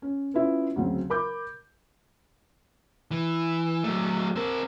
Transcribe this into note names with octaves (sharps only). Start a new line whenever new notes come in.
C#4
B3 C#4 E4 F4
D2 C#3 F#3 C4
A#4 B5 D6 G6
E3
F#3 A3
C4 A#4